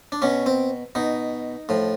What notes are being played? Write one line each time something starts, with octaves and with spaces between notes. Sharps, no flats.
D4
B2 C#4
C4
B2 D#4
A2 F3